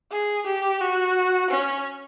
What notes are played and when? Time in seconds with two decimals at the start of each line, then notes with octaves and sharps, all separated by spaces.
0.11 G#4
0.46 G4
0.81 F#4
1.50 C#4